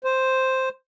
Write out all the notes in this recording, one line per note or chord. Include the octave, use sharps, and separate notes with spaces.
C5